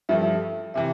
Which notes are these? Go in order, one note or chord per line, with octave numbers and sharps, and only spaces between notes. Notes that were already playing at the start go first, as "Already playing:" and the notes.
G2 F3 A3 E5
C3 E3 E5